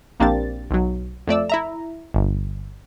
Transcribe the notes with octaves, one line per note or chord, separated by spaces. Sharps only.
A#1 A#3 C4 D4 G4 A6
B1 F#3
F2 A3 D5 E6
E4 E5 A#5
G1